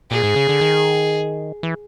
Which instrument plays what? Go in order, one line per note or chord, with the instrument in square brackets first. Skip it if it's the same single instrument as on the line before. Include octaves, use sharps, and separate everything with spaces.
[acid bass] A#2 [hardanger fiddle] G#4
[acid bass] G#2
C#3
D3
D#3
E3